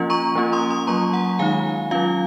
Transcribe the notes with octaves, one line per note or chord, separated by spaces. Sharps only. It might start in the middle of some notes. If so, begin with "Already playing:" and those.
Already playing: F3 A#3 C#4 F4
A#5 C#6
F3 A#3 C#4 F4
C6 D#6
C6 D#6
F#3 A#3 F4 A#5 C#6
F#5 A#5
D#3 G#3 D#4 F5 G#5
F#3 C#4 F4 F5